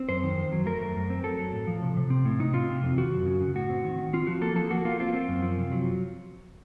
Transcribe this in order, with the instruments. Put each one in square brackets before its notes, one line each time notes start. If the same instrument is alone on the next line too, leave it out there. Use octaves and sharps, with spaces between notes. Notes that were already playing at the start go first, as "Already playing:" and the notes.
Already playing: [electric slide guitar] C4
F#2 C5
D#3
F2
F#3
A3 A#4
F#2
F#2
C4
F#3 A4
F#3
A2
F3
C3
C3
C4
A2
C3 D#4
C4 F4
C3
F2
D#3 F#4
F#2
C#3
C#3
A2 F#4
C4
D#3
D#3
C4 F4
F3 F#4
A#3 A4
F3 A4
A#3 F#4
A#3 F4
C4 F4
C4
F#2
F3
C3
F#3